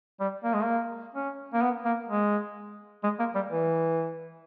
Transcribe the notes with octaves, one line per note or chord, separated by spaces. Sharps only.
G3
A#3
G#3
A#3
C#4
A#3
B3
A#3
G#3
G#3
A#3
G3
E3